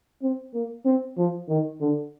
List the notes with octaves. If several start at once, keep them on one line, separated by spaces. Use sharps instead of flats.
C4
A#3
C4
F3
D#3
D3